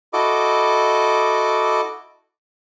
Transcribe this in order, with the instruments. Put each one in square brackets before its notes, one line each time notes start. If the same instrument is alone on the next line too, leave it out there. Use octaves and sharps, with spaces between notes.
[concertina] E4 F#4 A4 D#5 D6